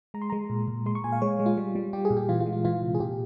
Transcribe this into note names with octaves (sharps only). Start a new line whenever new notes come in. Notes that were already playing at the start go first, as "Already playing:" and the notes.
G#3 A#5
C6
G#3 A#5
A#2
A#2
G#3 C6
C#6
A#2 G#5
F5
G#3 C#5
G#3
F4
G3
G3
G3 G4
G#4
A#2
G4
E3 F4
F4
G#3
F4
E3 F4
C3
G#4
A#2 G4